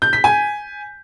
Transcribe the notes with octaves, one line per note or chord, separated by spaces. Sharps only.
G6
B6
G#5